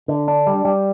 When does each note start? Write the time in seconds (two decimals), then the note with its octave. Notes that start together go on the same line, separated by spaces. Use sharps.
0.08 D3
0.28 D4
0.47 G3
0.65 G3